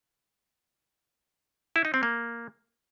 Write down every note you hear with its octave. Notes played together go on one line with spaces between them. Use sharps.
E4
D#4
C4
A#3